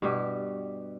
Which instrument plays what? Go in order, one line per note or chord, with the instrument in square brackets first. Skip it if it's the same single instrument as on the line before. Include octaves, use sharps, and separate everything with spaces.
[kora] G2 B2 G4